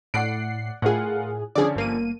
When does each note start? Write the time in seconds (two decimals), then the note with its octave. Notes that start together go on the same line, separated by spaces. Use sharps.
0.14 A2 D5 F#5 C7 D7
0.82 A2 F4 G#4 A#4 F#5
1.55 D3 F3 C#4 G#4 D5
1.76 G1 A#3 D#7